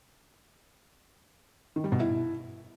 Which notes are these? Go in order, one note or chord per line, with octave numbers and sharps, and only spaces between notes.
D#3
G3
B2
E4